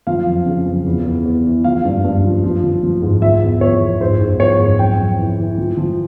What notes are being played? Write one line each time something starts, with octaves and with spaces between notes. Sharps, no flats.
F3 F5
F2
C#3
F2
E2
E2
E2
E3
F3 F5
G2
G2
F3
F3
F3
F3
G#2
F3 E5
E2
F3 C#5
E2
G#2 C5
G#2
F3 C#5
G#2
F2 G5
F2
E3
E3
F3
F3